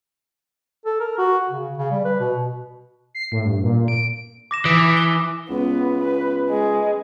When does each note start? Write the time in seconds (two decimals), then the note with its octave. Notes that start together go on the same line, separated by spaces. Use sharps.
0.85 A4
1.00 A#4
1.18 F#4
1.50 C#3
1.78 C#3
1.91 G3
2.05 B4
2.20 B2
3.15 C7
3.32 A2
3.45 G2
3.64 A#2
3.88 D7
4.51 D6 A#6 E7
4.65 E3 D#6 B6 D7
4.97 G7
5.50 C#2 B3
6.04 B4
6.50 G#3